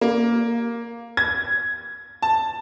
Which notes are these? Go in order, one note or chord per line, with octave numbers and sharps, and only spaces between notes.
A#3
G#6
A5